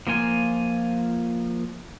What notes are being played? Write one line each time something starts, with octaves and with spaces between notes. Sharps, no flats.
F3 A#3 F4 G#5